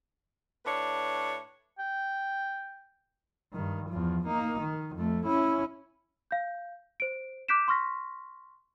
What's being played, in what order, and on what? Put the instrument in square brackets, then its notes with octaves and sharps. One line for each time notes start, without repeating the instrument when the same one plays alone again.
[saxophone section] A2 D4 B4 C#5
[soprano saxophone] G5
[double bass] G2 D#3
E2 F3
A#3 D#4
D#3
F2 A3
C#4 E4
[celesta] F5 G6
C5 D7
D6 F#6 G6 B6 D7 E7
C6 C#6 F6 A#6 B6